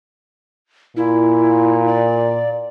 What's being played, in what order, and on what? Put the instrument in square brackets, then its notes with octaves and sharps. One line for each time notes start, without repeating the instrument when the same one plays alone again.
[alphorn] A#2 [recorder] E4
[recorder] D5